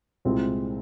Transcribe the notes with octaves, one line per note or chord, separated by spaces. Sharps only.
C2 A#2 G#3 C4 E4